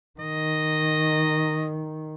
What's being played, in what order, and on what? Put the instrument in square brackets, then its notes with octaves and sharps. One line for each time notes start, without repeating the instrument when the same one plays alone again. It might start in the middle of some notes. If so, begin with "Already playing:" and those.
[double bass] D#3 [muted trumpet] D#5